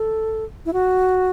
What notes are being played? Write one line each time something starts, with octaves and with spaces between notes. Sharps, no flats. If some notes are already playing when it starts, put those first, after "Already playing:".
Already playing: A4
E4
F#4